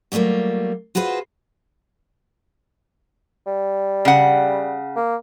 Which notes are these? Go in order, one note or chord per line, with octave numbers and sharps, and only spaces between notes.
F#3 G3 A3 A#3 F4
F4 F#4 G#4 B4 C5
G3
C#3 F#5
A#3